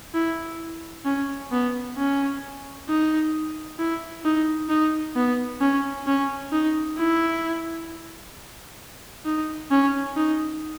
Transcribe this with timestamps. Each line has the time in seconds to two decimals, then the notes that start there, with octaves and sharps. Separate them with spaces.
0.14 E4
1.05 C#4
1.52 B3
1.97 C#4
2.88 D#4
3.79 E4
4.25 D#4
4.69 D#4
5.16 B3
5.61 C#4
6.07 C#4
6.52 D#4
6.98 E4
9.26 D#4
9.71 C#4
10.16 D#4